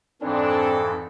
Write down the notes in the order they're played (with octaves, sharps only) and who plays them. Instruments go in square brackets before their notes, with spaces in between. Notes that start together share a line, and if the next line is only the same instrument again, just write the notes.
[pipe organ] F2 G#2 E3 [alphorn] C4 [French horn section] D4 [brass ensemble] A4